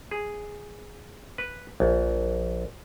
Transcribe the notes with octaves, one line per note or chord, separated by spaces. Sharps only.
G#4
B4
A#1